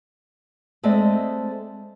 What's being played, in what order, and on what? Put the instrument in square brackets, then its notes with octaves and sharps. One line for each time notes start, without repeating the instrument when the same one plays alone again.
[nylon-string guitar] G#3 A3 C4 D5 D#5